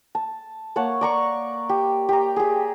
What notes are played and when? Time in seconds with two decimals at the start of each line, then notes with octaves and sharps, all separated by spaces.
0.15 A5
0.76 A#3 C#5 F#5 A5
1.01 D5 A#5 C#6
1.69 G4
2.09 G4 A#5
2.36 G4 G#4